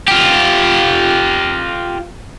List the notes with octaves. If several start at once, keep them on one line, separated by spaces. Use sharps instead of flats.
F4 G4